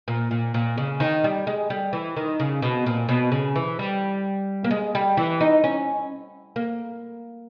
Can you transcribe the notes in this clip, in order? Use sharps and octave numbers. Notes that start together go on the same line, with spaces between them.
A#2
A#2
A#2
C#3
D#3
G3
G#3
G3
E3
D#3
C#3
B2
A#2
B2
C#3
E3
G3
A#3
G#3
G3
E3
D#4
C#4
A#3